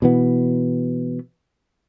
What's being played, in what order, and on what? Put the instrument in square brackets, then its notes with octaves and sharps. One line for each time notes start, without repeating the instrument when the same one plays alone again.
[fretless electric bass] B2 E3 B3